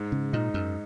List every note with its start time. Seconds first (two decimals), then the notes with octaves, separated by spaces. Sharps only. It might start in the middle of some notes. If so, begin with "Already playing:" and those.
Already playing: G#2
0.12 C#3
0.33 A#2 D#4
0.54 F#2